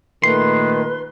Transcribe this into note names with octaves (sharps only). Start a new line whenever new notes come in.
A#2 D#3 A3 B4 C6